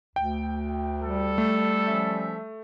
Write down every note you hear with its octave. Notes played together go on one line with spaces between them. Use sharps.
D2 G5
G3 A4
A3
F3 C#4 E5